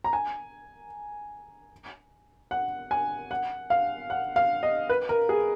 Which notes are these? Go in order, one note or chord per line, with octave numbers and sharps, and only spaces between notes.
A#5
G#5
F#5
G#5
F#5
F5
F#5
F5
D#5
B4
A#4
G#4